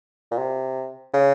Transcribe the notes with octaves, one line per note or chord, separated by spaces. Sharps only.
A#2
C3
C#3